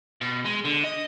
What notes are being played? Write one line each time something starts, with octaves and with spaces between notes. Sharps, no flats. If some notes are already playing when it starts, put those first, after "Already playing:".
B2
G#3
D3
D#5